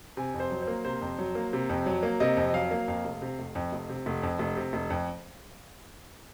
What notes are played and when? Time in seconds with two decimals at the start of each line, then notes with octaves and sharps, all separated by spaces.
0.17 C3 G#5
0.34 F2
0.40 C5
0.51 F#3
0.62 C5
0.67 A#3
0.85 C3 C5
1.01 F2
1.19 F#3
1.35 A#3
1.53 C3
1.69 F2
1.86 F#3
2.03 A#3
2.20 C3 D#5
2.37 F2
2.53 F#3 F5
2.71 A#3
2.88 F2 F5
3.05 F1
3.22 C3
3.39 F1
3.55 F2
3.72 F1
3.89 C3
4.06 F1
4.23 F2
4.39 F1
4.57 C3
4.73 F1
4.90 F2